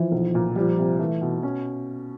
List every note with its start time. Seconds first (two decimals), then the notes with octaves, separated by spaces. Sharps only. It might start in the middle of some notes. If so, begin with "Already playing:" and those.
Already playing: E3 F3
0.12 B1
0.35 A#2
0.56 F3 G3
0.78 C3
0.99 E3 A3
1.22 B2
1.43 C#4